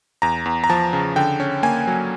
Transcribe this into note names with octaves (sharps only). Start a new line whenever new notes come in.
E2 A#5
E2
A#5
F3 A5
C#3
D3 G5
C#4
A#3 G#5
F#3